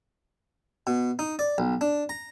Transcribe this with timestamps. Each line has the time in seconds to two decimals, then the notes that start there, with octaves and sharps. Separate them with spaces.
0.87 B2
1.19 D#4
1.39 D5
1.58 B1
1.81 D4
2.09 A#5